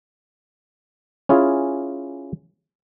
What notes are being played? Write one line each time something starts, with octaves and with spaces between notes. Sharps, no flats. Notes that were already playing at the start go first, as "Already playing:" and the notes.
C#4 E4 F4 G#4